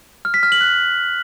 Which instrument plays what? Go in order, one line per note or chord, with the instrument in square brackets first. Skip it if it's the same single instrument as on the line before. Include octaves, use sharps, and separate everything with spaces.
[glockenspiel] F6
B6
F6
F#7
F#6